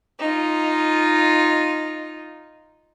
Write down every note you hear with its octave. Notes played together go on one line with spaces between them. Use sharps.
D#4 F4